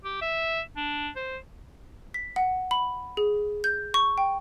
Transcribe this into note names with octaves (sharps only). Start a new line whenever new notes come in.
G4
E5
D4
C5
B6
F#5
B5
G#4
G6
C#6
G5